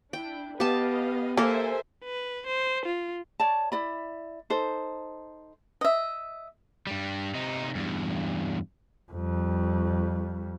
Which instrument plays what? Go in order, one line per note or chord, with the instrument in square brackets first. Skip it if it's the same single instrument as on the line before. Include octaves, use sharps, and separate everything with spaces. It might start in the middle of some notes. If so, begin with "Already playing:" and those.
[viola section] D4 E4 [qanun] G5
[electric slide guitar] B3 [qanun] G4 A5 [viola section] B4 D#5 F5
[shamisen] A#3 [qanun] A4 A#4 [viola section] C5 E5 G#5
[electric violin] B4
C5
F4
[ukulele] C#5 D5 A5
E4 D5 B5
D#4 A4 C5
[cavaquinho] D#5 E5
[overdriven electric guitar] G2 G3
C3 D#4
E2 G2
[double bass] F2 G3